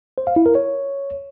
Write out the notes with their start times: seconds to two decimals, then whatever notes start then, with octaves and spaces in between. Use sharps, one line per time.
0.18 C5
0.27 F5
0.36 E4
0.46 A#4
0.55 C#5